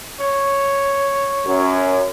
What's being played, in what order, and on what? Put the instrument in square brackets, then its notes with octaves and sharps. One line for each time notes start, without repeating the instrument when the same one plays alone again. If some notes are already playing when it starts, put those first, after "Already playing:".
[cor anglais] C#5
[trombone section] F#2